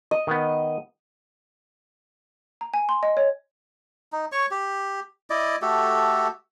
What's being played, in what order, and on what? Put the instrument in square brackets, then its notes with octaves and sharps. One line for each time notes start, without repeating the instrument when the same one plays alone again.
[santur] D#5
[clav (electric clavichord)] D#3 B3
[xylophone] A#5
G#5
C6
D#5
C#5
[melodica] D#4
C#5 C#6
G4
E4 D5 D#5
A3 F#4 G4 A4